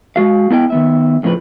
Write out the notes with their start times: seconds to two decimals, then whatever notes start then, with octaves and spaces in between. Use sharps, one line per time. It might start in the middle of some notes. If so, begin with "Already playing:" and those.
0.16 G#3 F#4 F5
0.50 B3 E4 D#5 G5
0.70 D#3 B3 E5
1.23 F2 A2 C#3 F3 B4